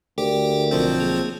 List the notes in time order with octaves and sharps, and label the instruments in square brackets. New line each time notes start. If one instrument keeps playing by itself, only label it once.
[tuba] D2 [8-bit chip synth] G4 [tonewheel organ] A4 A#4 D5
[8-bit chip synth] B1 F3 C4
[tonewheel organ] A#3 G#4